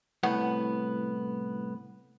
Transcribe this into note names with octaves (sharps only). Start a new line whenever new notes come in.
C2 A2 B3 F#5